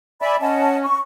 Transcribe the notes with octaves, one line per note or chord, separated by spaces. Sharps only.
D5 E5 G#5 B5
C#4 D#5 F#5 A5
C#6